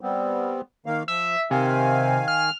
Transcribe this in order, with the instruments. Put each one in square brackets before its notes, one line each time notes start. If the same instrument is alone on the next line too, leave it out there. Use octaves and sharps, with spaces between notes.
[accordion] G3 B3 C4
D#3 A#3 F5
[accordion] F3 [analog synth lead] E5
[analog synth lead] C3 [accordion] D#3 F5 G#5
[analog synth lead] F6